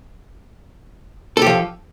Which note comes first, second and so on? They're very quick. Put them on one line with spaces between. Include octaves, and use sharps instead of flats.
A4 G4 F3